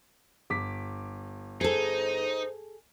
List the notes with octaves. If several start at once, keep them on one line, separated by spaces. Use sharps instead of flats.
G1 D6 B6
D#4 G#4 A4 C5